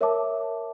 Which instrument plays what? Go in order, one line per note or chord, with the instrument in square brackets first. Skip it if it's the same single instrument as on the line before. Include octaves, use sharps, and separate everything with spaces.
[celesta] A#4 C#5 E5 A5 D6